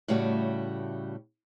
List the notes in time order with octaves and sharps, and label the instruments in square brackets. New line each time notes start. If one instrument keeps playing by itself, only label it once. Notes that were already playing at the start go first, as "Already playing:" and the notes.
[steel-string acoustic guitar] A2 C#3 G3 A3 F#4